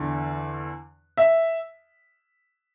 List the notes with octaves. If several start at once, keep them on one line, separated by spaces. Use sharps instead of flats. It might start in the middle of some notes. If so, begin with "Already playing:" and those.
Already playing: E2 D3
E5